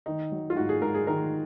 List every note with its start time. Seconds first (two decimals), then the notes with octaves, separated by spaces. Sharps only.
0.06 D#3 D#4
0.32 F#3
0.50 F4
0.57 G#2 F#4
0.69 G#4
0.81 G#2 A#4
0.95 G#4
1.07 D#3 A#4